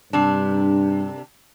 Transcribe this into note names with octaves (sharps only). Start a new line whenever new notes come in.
G2 C3 D4